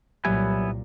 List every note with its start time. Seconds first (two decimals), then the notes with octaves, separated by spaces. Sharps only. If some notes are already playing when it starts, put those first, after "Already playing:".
0.25 C2 A#2 F#3 G3 B3 E4 G#5